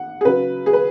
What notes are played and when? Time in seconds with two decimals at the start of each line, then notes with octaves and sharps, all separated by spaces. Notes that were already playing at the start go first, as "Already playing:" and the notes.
Already playing: F#5
0.21 G#4
0.25 C#3 F#3 B4
0.66 G#4
0.73 B4